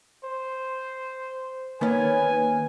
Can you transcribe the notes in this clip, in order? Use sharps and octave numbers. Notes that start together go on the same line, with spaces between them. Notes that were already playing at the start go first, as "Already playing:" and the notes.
C5
D#3 A#3 B3 C#4 B4 G#5